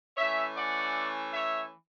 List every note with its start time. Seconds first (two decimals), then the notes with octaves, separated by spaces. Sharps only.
0.17 E3 A3 C#4 C#5 E5
0.56 D5 F#5
1.34 C#5 E5